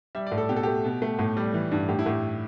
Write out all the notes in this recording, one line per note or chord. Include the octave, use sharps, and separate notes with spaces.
G3 E5
D5
A2
A4
B2 G4
A4
A3 G4
B2
A3
A2
G3
E3
G2
A2 G4
E4
A2 G4